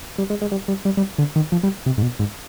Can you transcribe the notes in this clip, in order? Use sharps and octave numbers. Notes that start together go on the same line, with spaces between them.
G3
G#3
G#3
G3
G3
G3
G3
D3
D#3
F3
G3
C3
G#2
B2
G#2